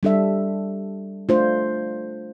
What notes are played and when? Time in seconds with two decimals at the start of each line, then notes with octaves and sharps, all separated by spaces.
0.03 G3 D4 A4 E5
1.29 A3 D4 F4 C5